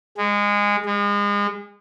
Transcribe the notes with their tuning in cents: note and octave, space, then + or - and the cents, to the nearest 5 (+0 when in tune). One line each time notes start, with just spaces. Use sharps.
G#3 -20
G#3 -35